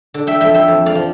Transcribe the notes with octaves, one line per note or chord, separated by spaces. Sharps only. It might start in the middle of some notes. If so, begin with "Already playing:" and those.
D3
E5 G5
F2 E5 G5
E5 G5
F2
D5 F5
F3